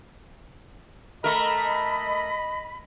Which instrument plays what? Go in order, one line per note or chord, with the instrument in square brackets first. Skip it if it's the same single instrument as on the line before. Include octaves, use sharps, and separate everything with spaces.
[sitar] A3 A#4 [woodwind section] D#5 B5